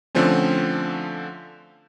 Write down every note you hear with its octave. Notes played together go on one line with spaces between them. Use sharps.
D3 F3 A3 C4 C#4